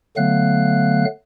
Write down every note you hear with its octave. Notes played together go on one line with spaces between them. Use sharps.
D3 F#3 A3 B3 F5 F#6